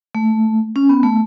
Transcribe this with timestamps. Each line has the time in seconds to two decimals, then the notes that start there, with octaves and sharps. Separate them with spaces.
0.15 A3
0.76 C#4
0.89 B3
1.03 A3